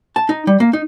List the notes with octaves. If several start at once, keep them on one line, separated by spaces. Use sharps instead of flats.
A5
D#4
G3
A#3
D#4